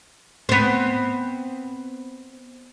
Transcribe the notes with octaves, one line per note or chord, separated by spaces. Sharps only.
B3 C4